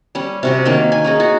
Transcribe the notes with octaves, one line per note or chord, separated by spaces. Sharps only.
G3 C#4
C3 F#4 G4
D#3 A#3 C#4
G#5
C#4 D#4 G#4
F#4